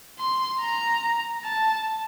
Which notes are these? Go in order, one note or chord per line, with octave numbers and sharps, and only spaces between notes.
C6
A#5
A5